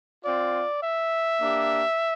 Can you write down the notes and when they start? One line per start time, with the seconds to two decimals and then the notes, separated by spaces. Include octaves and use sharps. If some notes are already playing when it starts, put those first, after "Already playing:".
0.23 C4 F4 D5
0.81 E5
1.41 A#3 D4 G4